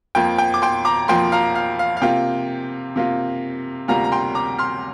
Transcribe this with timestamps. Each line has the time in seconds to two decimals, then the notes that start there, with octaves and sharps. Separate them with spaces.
0.15 F2 F3 A#3 G5
0.38 G5
0.54 D6
0.62 G5 C6
0.85 A#5 D6
1.08 F2 F3 A#3 G5 C6
1.32 F5 A#5
1.55 F5
1.79 F5
1.97 F5
2.02 C3 A#3 F4 G5
2.96 C3 A#3 F4
3.88 D2 C3 G3 A#3 F4 F5 A#5
4.04 A#5
4.12 G5 C6
4.35 A#5 D6
4.58 C6 F6